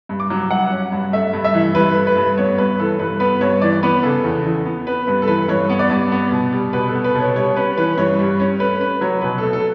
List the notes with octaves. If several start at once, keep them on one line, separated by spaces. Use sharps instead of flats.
G2
D6
F#3
G2 F#5
C#4
G2
A3 E5
G2
E5
E3
G2 B4
A3
B4
G2
B3 C#5
G2 B4
E3 A4
G2 B4
B3 B4
G2 C#5
E3 D5
B3 B4
C#3 A4
E2
E3
B3
B3 B4
G2 B4
A4
E3 B4
G2 C#5
B3
D5
G2
B3
B2
G3
B2 B4
A4
B3
B4
B2 C#5
G3 C#5
C#4 B4
E3 B4
G2 C#5
G3
C#4
A3 B4
C#4 B4
F#3 C#5
B2 B4
A3 A4
A4